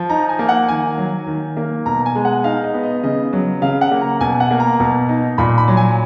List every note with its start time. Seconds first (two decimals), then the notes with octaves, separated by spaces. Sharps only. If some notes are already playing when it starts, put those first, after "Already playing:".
Already playing: F3
0.09 D#4 A#5
0.29 G#5
0.39 A#3
0.49 F#5
0.68 D#3 G#5
0.98 F#3
1.27 D#3
1.57 A#3
1.86 B2 A#5
2.06 G#5
2.15 G#3
2.25 F#5
2.44 D#4 F5
2.64 D#5
2.74 B3
2.83 D#5
3.03 C#3 D#5
3.33 F#3
3.62 C#3 F5
3.81 F#5
3.91 A#3
4.01 A#5
4.21 B2 G#5
4.40 F#5
4.51 A#3
4.60 A#5
4.80 B2
5.09 D#4
5.38 A#2 B5
5.58 B5
5.68 F#3
5.77 G#5